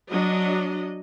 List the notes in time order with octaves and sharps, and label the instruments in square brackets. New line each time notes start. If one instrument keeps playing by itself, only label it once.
[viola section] F#3 D4 D#5